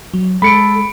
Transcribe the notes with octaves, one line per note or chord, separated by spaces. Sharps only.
F#3
G#3 A4 B5 C#7 D7